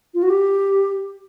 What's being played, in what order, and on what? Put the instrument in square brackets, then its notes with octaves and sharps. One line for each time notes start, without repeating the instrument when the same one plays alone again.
[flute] F4
F#4
G4